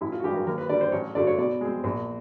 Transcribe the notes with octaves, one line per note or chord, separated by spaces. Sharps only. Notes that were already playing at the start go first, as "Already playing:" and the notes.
A1 E4
F4
F#4
G2 E3 G#3 G4
A#4
D#2 A#4
B4
D3 G3 D5
C5
A1 C#5
G2 D3 F#3 A3 D5
C#5
B2 D5
G#3 C4
A#1